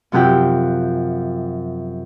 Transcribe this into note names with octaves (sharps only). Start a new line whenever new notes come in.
F#2 C3 F3 F#4 G4 G5